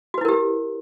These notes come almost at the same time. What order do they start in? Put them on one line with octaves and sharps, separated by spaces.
F#4 B4 E4 A#4 G4